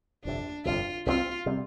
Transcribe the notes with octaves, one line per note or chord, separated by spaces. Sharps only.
G1 F2 C3 D4
G1 F2 C3 F4
C2 C3 G3 C4 F4
C3 G3 C4